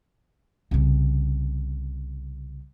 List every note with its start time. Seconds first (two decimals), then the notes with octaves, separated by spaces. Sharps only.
0.71 C2 C#3